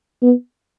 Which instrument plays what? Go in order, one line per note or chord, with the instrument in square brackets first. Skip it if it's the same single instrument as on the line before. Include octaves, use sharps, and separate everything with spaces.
[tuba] B3